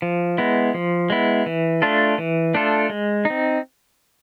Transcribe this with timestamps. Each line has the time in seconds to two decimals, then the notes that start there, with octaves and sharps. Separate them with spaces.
0.02 F3
0.38 G#3 B3 E4
0.74 F3
1.10 G#3 B3 E4
1.46 E3
1.82 A3 D4 F4 A4
2.18 E3
2.54 A3 D4 F4 A4
2.90 G#3
3.25 D#4
3.30 C4